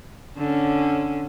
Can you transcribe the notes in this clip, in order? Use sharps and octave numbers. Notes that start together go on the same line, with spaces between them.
D3 C#4